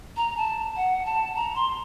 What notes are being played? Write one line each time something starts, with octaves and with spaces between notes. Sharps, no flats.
A#5
A5
F#5
A5
A#5
C6